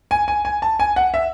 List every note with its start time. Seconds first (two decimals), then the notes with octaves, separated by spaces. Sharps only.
0.11 G#5
0.28 G#5
0.45 G#5
0.62 A5
0.80 G#5
0.96 F#5
1.14 E5